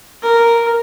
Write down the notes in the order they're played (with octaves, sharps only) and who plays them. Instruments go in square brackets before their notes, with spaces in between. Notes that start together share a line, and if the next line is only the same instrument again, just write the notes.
[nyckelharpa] A#4